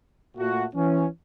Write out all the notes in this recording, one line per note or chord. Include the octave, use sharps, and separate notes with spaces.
A#2 A3 F#4
E3 C#4